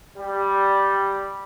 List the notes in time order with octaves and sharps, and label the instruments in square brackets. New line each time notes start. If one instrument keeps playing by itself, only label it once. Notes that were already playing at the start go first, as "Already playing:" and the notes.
[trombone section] G3